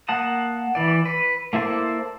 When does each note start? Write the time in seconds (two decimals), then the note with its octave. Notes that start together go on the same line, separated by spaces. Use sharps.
0.08 A#3 F#5 A5 D#6
0.75 E3 D5
1.05 B4
1.53 A#3 E4 A4 C5 D5